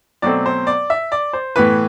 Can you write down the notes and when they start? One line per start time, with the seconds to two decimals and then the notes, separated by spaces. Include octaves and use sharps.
0.22 B2 F#3 A3 C4 D5
0.46 C5
0.67 D5
0.90 E5
1.12 D5
1.33 C5
1.56 A2 E3 B3 B4